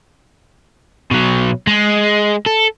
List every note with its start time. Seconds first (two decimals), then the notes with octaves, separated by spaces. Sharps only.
1.11 B2 F#3
1.67 G#3
2.46 A4